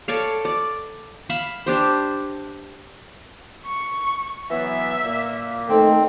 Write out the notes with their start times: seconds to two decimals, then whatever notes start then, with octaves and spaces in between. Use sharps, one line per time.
0.08 A4 C#5 D5 F5
0.45 D5
1.29 E5 F5 B5
1.66 D4 G4 C5
3.65 C#6
4.50 E3 F#3 B3 E5
5.03 A#2 A#3
5.69 D#3 A3 C4 A4